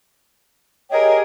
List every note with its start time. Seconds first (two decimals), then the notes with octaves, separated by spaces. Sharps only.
0.90 G4 G#4 A#4 C#5 D#5 G5